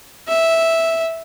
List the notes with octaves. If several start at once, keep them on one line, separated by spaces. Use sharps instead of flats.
E5